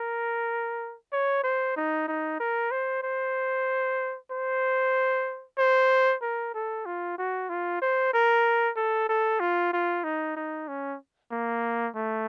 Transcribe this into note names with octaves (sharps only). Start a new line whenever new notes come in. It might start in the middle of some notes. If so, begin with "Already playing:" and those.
Already playing: A#4
C#5
C5
D#4
D#4
A#4
C5
C5
C5
C5
A#4
A4
F4
F#4
F4
C5
A#4
A4
A4
F4
F4
D#4
D#4
C#4
A#3
A3